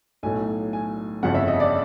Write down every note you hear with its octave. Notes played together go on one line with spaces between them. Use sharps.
B1 A2 F#3 A3 G#5
G#5
G1 F2 C#3 F#5
E5
D#5
D5